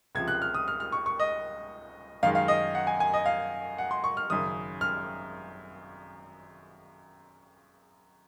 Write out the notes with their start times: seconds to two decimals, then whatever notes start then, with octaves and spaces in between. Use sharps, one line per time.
0.15 C#2 C3 F3 G#6
0.28 F#6
0.42 F6
0.54 D#6
0.68 F6
0.80 F6
0.92 C#6
1.06 C#6
1.20 D#5
2.23 F#2 D#3 G#3 F5
2.35 F5
2.48 D#5
2.75 F#5
2.87 G#5
3.00 G#5
3.14 D#5
3.26 F5
3.78 F#5
3.91 C6
4.04 C#6
4.17 F6
4.30 G#1 F#2 C#3 D#6
4.81 F6